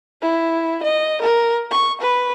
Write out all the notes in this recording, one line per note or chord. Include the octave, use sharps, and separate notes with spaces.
E4
D#5
A#4
C#6
B4